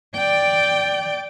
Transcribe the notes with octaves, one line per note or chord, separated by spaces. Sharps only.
D5 G5